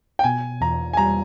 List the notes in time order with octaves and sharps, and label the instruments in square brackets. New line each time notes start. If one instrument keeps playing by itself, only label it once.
[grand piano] G5
[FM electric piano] B2 [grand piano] G#5
[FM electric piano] E2 [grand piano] A#5
[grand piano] G#5
[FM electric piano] G3 [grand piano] A#5